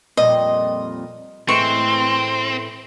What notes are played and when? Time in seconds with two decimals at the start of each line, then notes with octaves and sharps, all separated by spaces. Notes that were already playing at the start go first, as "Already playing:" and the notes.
0.17 F2 A#2 G3 D#5
1.48 A2 E3 G#3 C4 C6 C#6